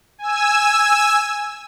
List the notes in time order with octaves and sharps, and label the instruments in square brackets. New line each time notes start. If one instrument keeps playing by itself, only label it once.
[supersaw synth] G#5 E6